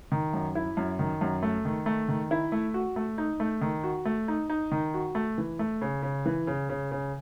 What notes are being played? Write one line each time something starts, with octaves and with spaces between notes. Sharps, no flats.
D#3
F#2
E4
F#2
D#3
F#2
A3
D#3
A3
D#3
E4
A3
F#4
A3
D#4
A3
D#3
F#4
A3
D#4
D#4
D#3
F#4
A3
E3
A3
C#3
C#3
E3
C#3
C#3
C#3